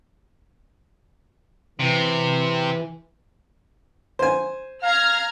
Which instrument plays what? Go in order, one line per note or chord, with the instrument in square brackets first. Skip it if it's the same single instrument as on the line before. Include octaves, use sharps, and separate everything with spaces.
[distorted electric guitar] C3 [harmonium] E3
[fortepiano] C5 G#5
[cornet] F5 [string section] A#5 F6 G#6